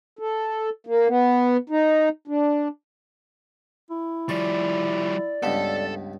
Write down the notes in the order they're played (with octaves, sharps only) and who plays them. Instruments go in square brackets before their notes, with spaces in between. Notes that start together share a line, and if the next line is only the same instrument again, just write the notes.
[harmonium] A4
A#3
B3
D#4
D4
[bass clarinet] E4
[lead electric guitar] F3 G3 [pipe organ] D5 [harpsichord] C#6
[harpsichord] C#2 G2 B3 [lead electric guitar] A4 A5